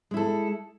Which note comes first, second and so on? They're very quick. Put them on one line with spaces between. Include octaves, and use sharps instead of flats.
G#3 E4 A4